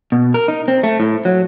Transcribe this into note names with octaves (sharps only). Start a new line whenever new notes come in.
B2
A#4
D#4
C4
A3
A2
F#3